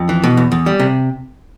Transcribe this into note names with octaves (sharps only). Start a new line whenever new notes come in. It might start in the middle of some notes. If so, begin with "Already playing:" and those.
Already playing: F2
E3
B2
E2
E2
G3
C3